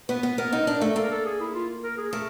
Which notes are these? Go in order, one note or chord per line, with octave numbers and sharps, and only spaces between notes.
B3 B4
B3
B3 A#4
D#4
D4
A3
A#3 A4
A#4
A4
G#4
E4
F4
A#4
G#4
A3 A#4